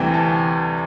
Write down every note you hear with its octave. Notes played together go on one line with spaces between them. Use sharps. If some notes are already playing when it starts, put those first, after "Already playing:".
Already playing: D2 C3 E3 G3 G5
A5